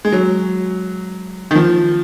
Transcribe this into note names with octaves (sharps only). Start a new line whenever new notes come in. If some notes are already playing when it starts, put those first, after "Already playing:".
G#3
F#3
D#3
F3